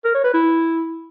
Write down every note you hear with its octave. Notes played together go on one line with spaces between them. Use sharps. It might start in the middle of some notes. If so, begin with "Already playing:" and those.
A#4
C#5
B4
E4